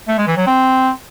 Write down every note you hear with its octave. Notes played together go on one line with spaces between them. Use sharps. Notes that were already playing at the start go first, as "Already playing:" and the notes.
A3
G#3
E3
F#3
C4